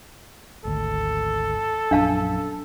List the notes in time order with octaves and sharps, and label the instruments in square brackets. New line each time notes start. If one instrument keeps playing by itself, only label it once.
[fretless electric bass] G#1 D2 [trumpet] A4
[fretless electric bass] A#1 F#2 [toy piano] D4 F5 A5